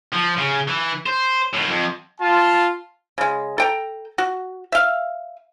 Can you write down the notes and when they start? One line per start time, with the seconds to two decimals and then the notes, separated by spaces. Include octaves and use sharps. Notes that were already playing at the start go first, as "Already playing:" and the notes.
0.13 F3
0.38 C#3
0.68 E3
1.06 C5
1.54 A2 D#3
1.69 F2
2.21 F4 A5
3.18 C#3 G#3
3.58 A4 G5 A#5
4.18 F#4
4.72 E5 F5